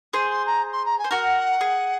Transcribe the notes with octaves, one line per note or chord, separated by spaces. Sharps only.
G#4 C5 C6
C6
A#5
C6
A#5
G#5
C5
F#4 A#4 F#5
G#4